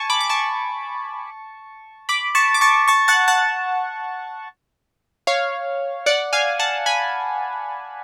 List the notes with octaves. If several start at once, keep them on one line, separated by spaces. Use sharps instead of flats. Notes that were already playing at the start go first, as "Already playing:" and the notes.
Already playing: G#5 A5 C#6
B5 D6
D6
A5 C#6
B5 D6
A5 C#6
D6
A5 C#6
A5 C#6
F#5 A5
F#5 A5
C#5 F5
D5 F#5
F5 G#5
F#5 A5
G#5 B5